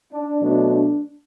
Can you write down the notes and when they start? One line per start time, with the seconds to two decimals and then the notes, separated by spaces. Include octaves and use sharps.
0.13 D4
0.42 B2 F#3 A3 D4
0.71 D4